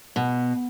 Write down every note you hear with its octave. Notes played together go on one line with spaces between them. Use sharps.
B2